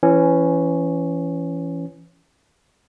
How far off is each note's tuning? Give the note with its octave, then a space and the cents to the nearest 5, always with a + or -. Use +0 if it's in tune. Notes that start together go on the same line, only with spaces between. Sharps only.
E3 +25 C#4 +0